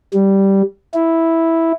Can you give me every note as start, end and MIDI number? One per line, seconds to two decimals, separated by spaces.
0.14 0.62 55
0.94 1.72 64